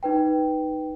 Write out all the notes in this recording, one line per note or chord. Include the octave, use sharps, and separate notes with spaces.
D#4 B4 G5